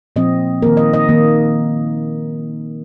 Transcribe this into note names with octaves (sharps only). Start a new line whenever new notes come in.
A#2 F3 C4 D#5
D#3 A#3 A#4
D#5
D#5
D#3 A#3